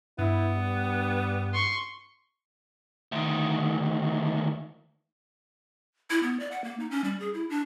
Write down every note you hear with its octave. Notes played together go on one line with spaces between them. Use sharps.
G2 B3 E4
G3
C6 C#6
D2 D#3
E4
B3
D5
F#5
A#3
D#4
C#4
G3
G#4
E4
D4